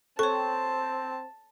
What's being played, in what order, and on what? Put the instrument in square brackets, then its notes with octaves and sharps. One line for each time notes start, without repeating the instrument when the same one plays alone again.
[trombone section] C4 [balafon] A4 [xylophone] C#5 C#6 [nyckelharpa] A5